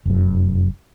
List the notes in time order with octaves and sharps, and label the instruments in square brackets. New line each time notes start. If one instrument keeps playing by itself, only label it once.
[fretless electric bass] F1 F#2